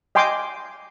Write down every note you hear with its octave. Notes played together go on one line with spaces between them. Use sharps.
D#5 G5 G#5 C6 D6